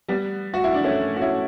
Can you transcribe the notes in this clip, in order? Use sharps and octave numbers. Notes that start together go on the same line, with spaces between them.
G3 B3
F#4
E4
D4
A3 C#4
F#4
C#4 E4